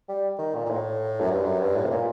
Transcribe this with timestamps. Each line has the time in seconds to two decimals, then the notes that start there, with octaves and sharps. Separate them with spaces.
0.09 G3
0.38 D#3
0.55 A#2
0.65 A#2
0.70 A2
1.20 F#2
1.30 G2
1.45 F#2
1.60 G2
1.76 A2
1.85 C3
1.90 A#2